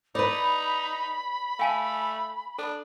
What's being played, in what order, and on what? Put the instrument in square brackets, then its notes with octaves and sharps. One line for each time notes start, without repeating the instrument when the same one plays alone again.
[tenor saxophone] D#4 [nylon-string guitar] B4 D5 [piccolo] B5
[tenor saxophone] A3 [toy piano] F5 G#5 A5
[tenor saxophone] D4 [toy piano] A4